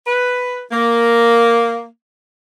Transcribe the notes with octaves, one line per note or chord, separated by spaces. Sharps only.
B4
A#3